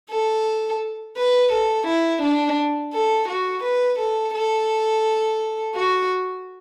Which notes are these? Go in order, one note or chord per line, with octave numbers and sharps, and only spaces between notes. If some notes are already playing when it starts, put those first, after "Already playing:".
A4
B4
A4
E4
D4
A4
F#4
B4
A4
A4
F#4